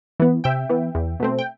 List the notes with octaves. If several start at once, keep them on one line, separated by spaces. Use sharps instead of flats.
E3 B3
C3 E5 G5
E3 B3
E2
B2 A3 C4
G5